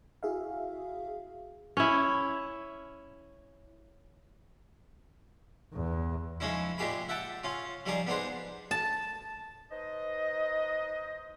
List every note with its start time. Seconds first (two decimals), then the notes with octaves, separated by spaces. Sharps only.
0.23 E4 F#4 G#4 E5 F5
1.77 C#4 E4
5.74 E2
6.40 F3 G#3 C#4 D#4 E4
6.78 A#2 G#3 G4 G#4 B5
7.09 E5 F#5 G5 A5
7.44 C#4 F4
7.86 F3 G3 D#4 G#4 D5
8.07 B3 D4 D#4 G#4 C5
8.71 A5
9.71 D#4 B4 C5 D#5